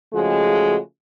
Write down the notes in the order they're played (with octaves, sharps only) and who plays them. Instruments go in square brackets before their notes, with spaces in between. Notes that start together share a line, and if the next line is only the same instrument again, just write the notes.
[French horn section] C#3 F3 G#3 A3 F#4